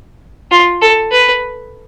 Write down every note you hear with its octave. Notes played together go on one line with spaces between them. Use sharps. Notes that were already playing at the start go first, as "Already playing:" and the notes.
F4
A4
B4